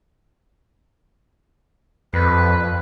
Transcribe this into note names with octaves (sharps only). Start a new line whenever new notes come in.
F2 B4